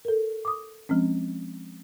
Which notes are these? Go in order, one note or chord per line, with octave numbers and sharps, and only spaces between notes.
A4 A#4
D6 D#6
F3 G#3 C4 C#4